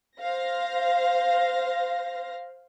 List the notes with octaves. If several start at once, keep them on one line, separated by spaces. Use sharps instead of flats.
C5 F5 A#6